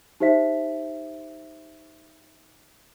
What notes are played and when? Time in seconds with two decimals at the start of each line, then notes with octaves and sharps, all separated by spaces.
0.20 D#4 G4 C5 E5 B6